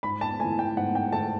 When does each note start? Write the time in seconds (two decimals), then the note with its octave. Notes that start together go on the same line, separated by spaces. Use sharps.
0.03 G#2 B5
0.21 A5
0.40 A3 G#5
0.44 E3
0.59 G5
0.77 G#2 F#5
0.95 G5
1.12 E3 A3 A5